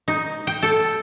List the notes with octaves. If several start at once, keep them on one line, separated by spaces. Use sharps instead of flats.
D#4
G5
A4